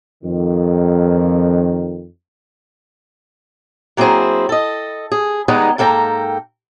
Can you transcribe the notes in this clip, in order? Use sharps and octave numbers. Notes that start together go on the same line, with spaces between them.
F2 D#3
F#3 A#3 C4 E4 G#4 C5
A4 D#5
G#4
D#3 G3 G#3 B3 D#4 G#4
G#2 A#3 A4 G5 A#5